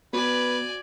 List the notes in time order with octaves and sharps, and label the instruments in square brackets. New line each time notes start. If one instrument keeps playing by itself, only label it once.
[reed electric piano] B3 [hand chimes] F#4 [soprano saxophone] B4 [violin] D5 G#5